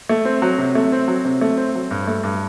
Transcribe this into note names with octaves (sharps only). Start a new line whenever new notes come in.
A3
C4
F#3
C3
A3
C4
F#3
C3
A3
C4
F#3
G2
A3
G2